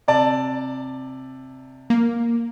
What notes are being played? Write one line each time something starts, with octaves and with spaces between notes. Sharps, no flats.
C3 D5 A5
A#3